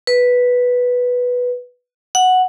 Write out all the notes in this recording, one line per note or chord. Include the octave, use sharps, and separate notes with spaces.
B4
F#5